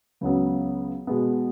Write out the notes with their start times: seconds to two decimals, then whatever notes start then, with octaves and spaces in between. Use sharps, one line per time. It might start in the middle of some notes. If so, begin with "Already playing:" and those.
0.21 C#2 C#3 F#3 B3
1.07 B2 G#3 B3